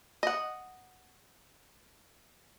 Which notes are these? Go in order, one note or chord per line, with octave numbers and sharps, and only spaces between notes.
D#5 F#5